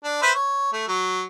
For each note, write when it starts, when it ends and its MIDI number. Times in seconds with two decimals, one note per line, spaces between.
0.04 0.18 62
0.22 0.31 71
0.22 0.31 72
0.22 0.31 76
0.35 0.71 73
0.73 0.83 57
0.88 1.22 54